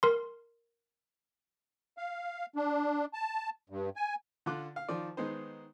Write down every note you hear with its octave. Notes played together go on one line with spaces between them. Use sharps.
A#4 C6
F5
D4
A5
G2
G#5
D3 D4 F4 D6 F#6
F5
D#3 F3 F4 D5
D#3 G#3 B3 D#4 C5